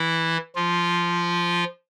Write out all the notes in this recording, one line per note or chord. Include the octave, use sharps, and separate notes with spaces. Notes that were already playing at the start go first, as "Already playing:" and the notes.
Already playing: E3 E4
F3 F4